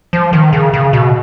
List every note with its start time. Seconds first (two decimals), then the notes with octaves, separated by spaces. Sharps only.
0.13 F3
0.33 D#3
0.53 C#3
0.73 C#3
0.93 B2